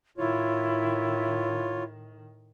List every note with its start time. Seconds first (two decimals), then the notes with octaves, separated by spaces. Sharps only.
0.18 A2 D#3 E4 F4 C#5